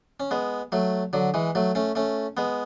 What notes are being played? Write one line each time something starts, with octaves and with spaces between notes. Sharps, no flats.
C#4
G#3 B3
F#3 A3
D3 F#3
E3 G#3
F#3 A3
A3 C#4
A3 C#4
G#3 B3